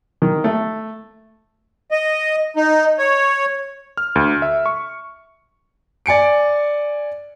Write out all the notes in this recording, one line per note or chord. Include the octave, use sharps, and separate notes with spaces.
D#3
A3
D#5
D#4
C#5
F6
D2
E5
C#6
D5 G#5 C#7 D7